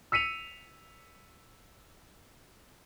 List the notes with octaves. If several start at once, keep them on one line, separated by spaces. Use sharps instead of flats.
E6 B6 C#7 D#7 F7